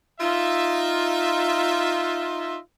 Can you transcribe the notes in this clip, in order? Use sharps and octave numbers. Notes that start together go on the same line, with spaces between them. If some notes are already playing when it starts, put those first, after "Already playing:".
D#4 F4 E5